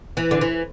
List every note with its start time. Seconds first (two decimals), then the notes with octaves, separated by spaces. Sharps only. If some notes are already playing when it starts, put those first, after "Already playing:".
0.17 E3
0.31 D3
0.41 E3